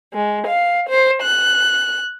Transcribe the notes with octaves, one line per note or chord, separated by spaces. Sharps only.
G#3
F5
C5
F#6